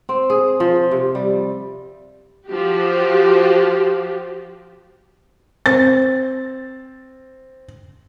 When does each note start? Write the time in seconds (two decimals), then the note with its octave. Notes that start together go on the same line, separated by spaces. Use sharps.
0.09 C4
0.30 G#4
0.60 F3
0.91 C3
1.15 G3
2.47 F3 F#4 G4
5.66 C4 A6